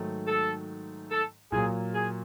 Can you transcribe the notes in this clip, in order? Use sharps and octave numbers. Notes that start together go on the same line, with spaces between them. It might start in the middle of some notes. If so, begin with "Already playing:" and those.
Already playing: G#2 D#3 F#3 A3
A4
A4
A#2 F#3 A#3 G#4
G#4